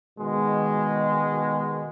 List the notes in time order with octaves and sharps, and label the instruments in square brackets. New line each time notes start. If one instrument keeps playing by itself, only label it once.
[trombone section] B2 D#3 G#3